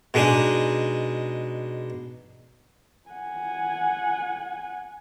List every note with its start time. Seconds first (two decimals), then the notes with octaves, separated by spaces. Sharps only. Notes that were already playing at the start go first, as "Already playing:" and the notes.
0.14 B2 G#3 D4 D#4 G#4
3.10 F#5 G#5